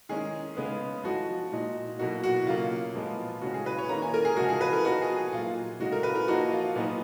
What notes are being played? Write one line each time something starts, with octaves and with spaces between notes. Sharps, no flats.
D#3 G#3 C#4 G#4
C#3 G#3 B3
F3 G#3 D#4 F#4
A#2 G#3 D#4
B2 F#3 A#3 D#4 F#4
F#4
C#3 F#3 A#3 F4
A#2 F3 G#3 B3
C#3 G#3 C#4 F#4
G#4
B4
C#5
D#3 A#3 C#4 A#5
G#5
A#4
G#4
C#3 F3 G#3 F#4
G#4
B4
A#4
F3 B3 D#4 F#4
G#4
G#4
A#2 F#3 A#3 F4
C#3 G#3 D#4 F#4
A#4
B4
A#4
F3 A#3 D#4 F#4
F4
A#2 F#3 B3 D#4